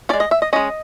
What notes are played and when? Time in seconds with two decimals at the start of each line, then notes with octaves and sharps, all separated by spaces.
0.09 G#3 C#4 D5
0.20 D#5
0.31 E5
0.42 D#5
0.53 G#3 C#4 D#5